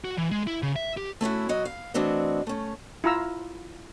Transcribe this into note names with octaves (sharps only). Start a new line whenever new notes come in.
F#4
E3
G#3
E4
C#3
E5
G4
A3 C#4 E4 F#4
F#3 F#4 D#5
F5
E3 A3 C4 D4 F#4 D#5
A3 C#4
E4 F4 A#5 E6